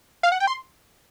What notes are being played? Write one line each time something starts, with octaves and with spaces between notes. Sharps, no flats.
F5
F#5
G5
C6